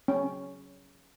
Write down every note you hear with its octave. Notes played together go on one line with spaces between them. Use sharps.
C#4